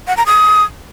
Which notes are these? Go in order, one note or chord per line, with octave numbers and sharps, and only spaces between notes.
F#5
A#5
D#6